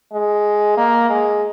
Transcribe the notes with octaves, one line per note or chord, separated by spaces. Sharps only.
G#3
A#3
G#3